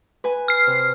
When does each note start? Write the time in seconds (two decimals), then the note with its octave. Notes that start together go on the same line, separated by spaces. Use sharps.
0.24 B4 G#5
0.48 F6 C7
0.67 C3